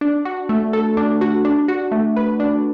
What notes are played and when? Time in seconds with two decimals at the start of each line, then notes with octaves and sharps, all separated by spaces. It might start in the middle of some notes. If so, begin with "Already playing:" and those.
0.01 D4
0.25 F#4
0.49 A3
0.73 A4
0.97 D4
1.21 F#4
1.45 D4
1.68 F#4
1.92 A3
2.16 B4
2.40 D4